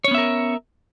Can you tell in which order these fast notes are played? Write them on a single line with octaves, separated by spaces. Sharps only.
C#5 C#4 B3 E5 A#4